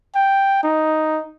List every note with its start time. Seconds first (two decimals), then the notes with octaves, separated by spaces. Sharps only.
0.15 G5
0.63 D#4